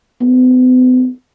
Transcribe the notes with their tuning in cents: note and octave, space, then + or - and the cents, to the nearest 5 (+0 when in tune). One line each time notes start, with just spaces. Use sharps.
B3 +45